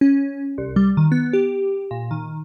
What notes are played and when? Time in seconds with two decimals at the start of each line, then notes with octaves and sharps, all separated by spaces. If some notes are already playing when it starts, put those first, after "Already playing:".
0.01 C#4
0.58 C2
0.76 G3
0.97 D#3
1.12 B3
1.33 G4
1.91 A#2
2.11 D#3